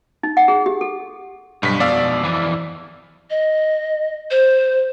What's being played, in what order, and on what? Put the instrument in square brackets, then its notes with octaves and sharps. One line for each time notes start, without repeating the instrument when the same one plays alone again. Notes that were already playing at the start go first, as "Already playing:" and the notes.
[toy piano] D#4
F#5
G#4
G4
A4
[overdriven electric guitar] B1 [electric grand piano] G2 B6
[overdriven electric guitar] F2 B2 [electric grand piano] D5 F5 E6
[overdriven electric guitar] F2 E3
[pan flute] D#5
C5